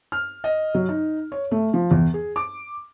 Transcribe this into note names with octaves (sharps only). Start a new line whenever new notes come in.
F6
D#5
F#3
D#4
C#5
A3
F3
E2
G#4
D6